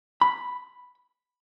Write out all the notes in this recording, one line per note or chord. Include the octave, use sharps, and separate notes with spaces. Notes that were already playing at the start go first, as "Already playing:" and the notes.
B5